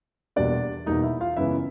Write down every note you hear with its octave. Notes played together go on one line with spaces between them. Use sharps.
E2 B2 G3 A#3 D4 D5
E2 B2 G3 A#3 D#4 D#5
E4 E5
F4 F5
F#2 C#3 E3 G#3 B3 E4 E5